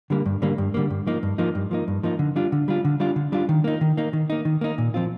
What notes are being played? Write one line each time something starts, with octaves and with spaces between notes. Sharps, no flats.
D3 G3 A#3
G2
D3 G3 A#3
G2
D3 G3 A#3
G2
F3 A#3 D#4
G2
F3 A#3 D#4
G2
F3 A#3 D#4
G2
F3 A#3 D#4
D3
G3 D4 F4
D3
G3 D4 F4
D3
G3 D4 F4
D3
G3 D4 F4
D#3
A#3 D#4
D#3
A#3 D#4
D#3
A#3 D#4
D#3
A#3 D#4
A#2
F3 C4 F4